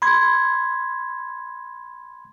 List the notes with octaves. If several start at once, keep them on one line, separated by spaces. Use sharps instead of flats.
B5 C6 G#6